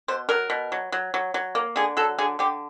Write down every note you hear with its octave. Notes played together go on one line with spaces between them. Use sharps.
B2 C5
F#3 A#4
B2
F#3
F#3
F#3
F#3
A#3
D3 G#4
F#3 A4
D3 G#4
D3 G4